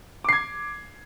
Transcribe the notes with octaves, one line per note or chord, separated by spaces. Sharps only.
D6 G#6 C7